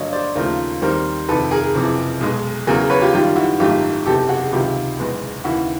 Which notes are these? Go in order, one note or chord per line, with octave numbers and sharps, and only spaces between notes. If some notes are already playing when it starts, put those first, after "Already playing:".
Already playing: G2 D3 F#3 A#3 C#5 D#5
C5 D5
D#2 C#3 F3 A3 A#4 C5
D#2 D#3 G3 C4 A#4 C5
F2 C3 D#3 A4 B4
G#4 A#4
F#1 F2 C3 E3
B1 B2 G#3
E2 C#3 F#3 G#4 A#4
B4 C#5
F4 G4
F#2 D#3 G3 F4 G4
E4 F#4
G#1 F#2 D#3 F#3 A3 F4 G4
F#1 E2 C3 G4 A4
F#4 G#4
C#2 C3 D#3 F#3 F4 G4
F#1 E2 B2 G#3 B3
D#2 C#3 E3 E4 F#4